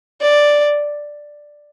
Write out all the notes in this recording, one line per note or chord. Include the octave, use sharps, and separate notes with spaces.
D5